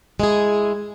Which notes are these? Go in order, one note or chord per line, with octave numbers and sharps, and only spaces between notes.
G#3 E4 G#4